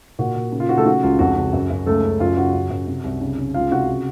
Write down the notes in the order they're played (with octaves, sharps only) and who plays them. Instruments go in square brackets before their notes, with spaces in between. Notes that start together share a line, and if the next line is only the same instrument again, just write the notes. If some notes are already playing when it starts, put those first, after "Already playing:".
[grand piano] A#2 F#4
A#2
C#3
F4
C#3 F#4
A3 A4
C#3 F#4
C#2 F4
F2 F#4
C#3
F#2
F#2
C#2 A3 A4
C#3
F#2 F4
C#3 F#4
F#2
F#2
C3
C2
C#3
C#3
C#2 F4 F5
C3 F#4 F#5
C#3